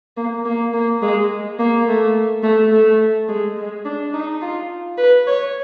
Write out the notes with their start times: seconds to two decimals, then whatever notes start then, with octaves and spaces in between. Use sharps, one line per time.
0.17 A#3
0.45 A#3
0.73 A#3
1.02 G#3
1.59 A#3
1.88 A3
2.43 A3
2.72 A3
3.29 G#3
3.57 G#3
3.85 D4
4.13 D#4
4.42 F4
4.98 B4
5.27 C#5